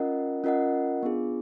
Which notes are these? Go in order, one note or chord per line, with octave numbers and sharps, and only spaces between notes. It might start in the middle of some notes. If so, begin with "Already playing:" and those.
Already playing: C#4 F4 A#4 D#5 F#5
C#4 F4 A#4 D#5 F#5
B3 D4 F4 G#4